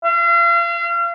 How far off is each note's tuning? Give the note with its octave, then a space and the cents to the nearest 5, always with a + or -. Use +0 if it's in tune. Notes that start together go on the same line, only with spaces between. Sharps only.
F5 -40